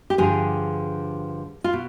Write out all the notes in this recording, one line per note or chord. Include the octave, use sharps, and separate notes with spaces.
G4
G2 D3 F3 G#4
F4
B2